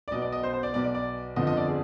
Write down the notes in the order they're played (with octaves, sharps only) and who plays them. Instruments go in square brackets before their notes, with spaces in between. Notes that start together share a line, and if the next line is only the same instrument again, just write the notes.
[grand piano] D5
B1 B2 D#5
D5
D#5
C5
C5
D5
B1 B2 D5
D5
D5
G1 F2 D3 F3 D#5
D#5
D5
G#4